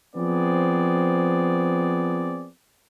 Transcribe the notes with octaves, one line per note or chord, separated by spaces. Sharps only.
F3 B3 C4 G#4 D5